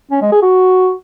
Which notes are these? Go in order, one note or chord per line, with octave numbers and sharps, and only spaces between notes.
C#4
G#3
G#4
F#4